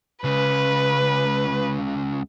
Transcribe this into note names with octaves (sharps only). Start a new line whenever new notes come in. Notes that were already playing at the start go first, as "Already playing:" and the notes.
C#2 C#3 B4